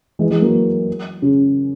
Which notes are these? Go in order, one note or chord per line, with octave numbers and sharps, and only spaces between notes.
E3 G#3
E3 G#3
F#3 A#3
C#3